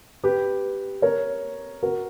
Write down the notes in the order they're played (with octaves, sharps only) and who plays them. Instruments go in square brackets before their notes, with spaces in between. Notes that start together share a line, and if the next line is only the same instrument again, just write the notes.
[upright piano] G4 B4
A#4 C#5
F#4 A#4